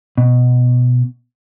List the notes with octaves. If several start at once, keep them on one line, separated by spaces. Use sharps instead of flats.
B2